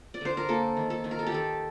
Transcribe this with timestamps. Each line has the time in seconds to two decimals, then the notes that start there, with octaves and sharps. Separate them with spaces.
0.14 D5
0.21 D3 C5
0.37 A#4
0.49 A#3 A4
0.77 D#3
0.90 A4
1.04 D#3
1.11 A#4
1.19 A4
1.27 G4
1.32 D#3 A4